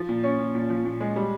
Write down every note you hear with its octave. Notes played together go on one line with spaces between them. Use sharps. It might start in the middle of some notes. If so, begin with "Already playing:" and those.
Already playing: F3
A#2
C#4
A#2
A#2
F3
A#2
G#3
G3